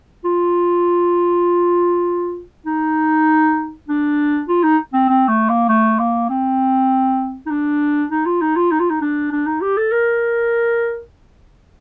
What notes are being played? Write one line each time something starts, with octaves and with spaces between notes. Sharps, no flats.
F4
D#4
D4
F4
D#4
C4
C4
A3
A#3
A3
A#3
C4
D#4
D4
D#4
F4
D#4
F4
D#4
F4
D#4
D4
D4
D#4
G4
A4
A#4